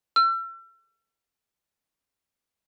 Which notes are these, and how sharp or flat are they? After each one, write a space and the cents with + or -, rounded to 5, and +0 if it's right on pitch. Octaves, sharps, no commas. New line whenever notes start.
E6 +40